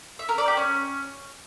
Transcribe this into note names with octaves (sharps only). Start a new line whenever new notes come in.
E5
A#4
D5
G4
C#4